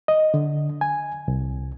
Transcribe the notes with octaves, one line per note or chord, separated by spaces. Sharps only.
D#5
D3
G#5
C2